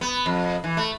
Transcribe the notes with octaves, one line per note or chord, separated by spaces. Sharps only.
B3
F2
E3
A3